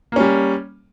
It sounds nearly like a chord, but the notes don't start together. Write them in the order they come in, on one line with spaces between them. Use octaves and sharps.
A#3 C#4 G3